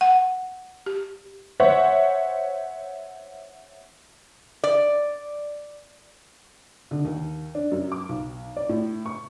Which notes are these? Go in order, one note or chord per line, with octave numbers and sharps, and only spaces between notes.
F#5
G4
C5 C#5 E5 F#5
D5
D3
D#2
D4
F#2
D6
B1
D5
A2
C#6